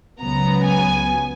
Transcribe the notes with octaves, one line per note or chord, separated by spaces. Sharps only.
C#2 C#3 F#3 B3 A#5
G#5